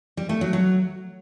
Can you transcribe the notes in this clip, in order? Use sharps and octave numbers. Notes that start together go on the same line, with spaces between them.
G3
A3
F#3
F#3